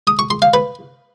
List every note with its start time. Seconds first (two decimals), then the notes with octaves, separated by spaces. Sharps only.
0.07 D#6
0.19 C#6
0.30 C6
0.42 F5
0.54 B4